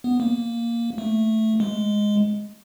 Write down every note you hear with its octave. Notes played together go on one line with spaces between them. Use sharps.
B3
A#3
A3
G#3